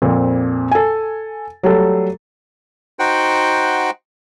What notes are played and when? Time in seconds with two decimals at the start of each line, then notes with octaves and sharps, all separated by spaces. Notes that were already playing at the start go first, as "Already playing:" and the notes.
0.02 F2 A#2 C4
0.71 A4 G#5
1.63 F#3 G3 A3 A4
2.99 D#4 F#4 C5 F#5 G5